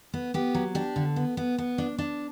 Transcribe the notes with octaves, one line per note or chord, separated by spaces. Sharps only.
B3
B3 G4
F#3
D4 G4
D3
B3
B3
B3
D4
D4